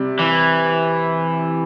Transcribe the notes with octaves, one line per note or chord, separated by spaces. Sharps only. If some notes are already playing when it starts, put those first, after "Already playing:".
Already playing: C3 G3
E3